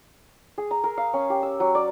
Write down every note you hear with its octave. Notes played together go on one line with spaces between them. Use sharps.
G#4
A#5
A#4
F5
C#4
G4
E6
F#3
D5